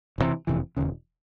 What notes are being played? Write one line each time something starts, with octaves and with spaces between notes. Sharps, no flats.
F#1 F2 C3 E3
F#1 F2 C3 E3
E1 D#2 C#3